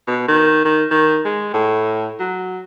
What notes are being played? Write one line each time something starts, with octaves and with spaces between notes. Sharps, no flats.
B2
D#3
D#3
D#3
G#3
A2
F#3